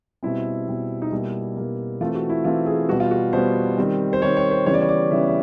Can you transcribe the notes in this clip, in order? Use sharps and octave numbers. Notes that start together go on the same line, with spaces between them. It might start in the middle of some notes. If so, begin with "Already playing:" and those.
B2 G3 C4 E4
B2 G3 C4
D#4
B2 G3 A#3 E4
B2 G3 A#3
E3 A3 C4 F4
F#4
E4
E3 A3 C4 F4
G#4
B2 G3 B3 F#4
F4
F#4
B2 G3 B3 C5
D#3 G3 C4
C5
D#3 G3 C4 C#5
C#5
C5
C#3 E3 G3 B3 C#5
D5
C#5
D5
C#3 E3 G3 B3 E5
E5